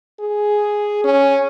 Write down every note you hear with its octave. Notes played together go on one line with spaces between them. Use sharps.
G#4
C#4